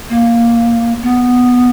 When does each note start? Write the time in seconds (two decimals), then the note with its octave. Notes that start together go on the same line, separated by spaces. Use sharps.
0.09 A#3
1.02 B3